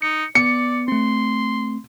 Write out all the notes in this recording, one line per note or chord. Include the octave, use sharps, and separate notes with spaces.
D#4 C#7
B3 D5 C#7
A3 C4 C6